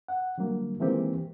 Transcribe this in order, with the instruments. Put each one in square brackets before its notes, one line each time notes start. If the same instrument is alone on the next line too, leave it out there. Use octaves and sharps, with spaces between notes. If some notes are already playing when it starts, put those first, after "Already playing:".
[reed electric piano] F#5
D3 F#3 G3 A#3
D#3 E3 G#3 A#3 C4 G4